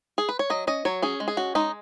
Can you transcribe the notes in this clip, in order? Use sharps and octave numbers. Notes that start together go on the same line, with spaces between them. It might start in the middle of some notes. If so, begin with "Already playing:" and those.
G#4
B4
C#5
F#3 D#5
C#4 D#5
F#3 C#5
C#4 G#4
G#3
G#4
C#4 F#4
G#3 D#4